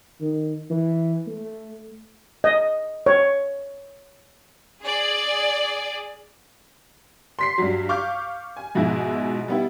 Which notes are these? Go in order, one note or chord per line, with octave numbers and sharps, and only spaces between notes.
D#3
E3
A3
D#5
C#5
G#4 D5
C6 B6 C7
G2 F#3
F5 C#6 D6 F6 G6
G#5
G#2 B2 F3 E4 G#4
G3 B3 E4